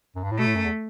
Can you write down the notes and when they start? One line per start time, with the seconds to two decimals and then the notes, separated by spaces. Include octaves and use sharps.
0.15 F#2
0.24 G2
0.31 A2
0.39 B2 A3
0.46 A2
0.56 F#2
0.64 E2